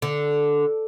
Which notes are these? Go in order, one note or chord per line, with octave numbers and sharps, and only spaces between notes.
D3